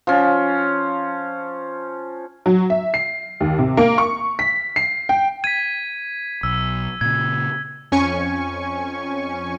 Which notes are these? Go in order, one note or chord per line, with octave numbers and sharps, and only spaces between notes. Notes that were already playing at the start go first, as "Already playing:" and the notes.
F3 C#4
F#3
E5
C7
D#2
C3
A#3
C#6
B6
C7
G5
G#6 B6 D#7
B1 E6
A#2 C#3 G#6
F2 C#4 G#5 C#6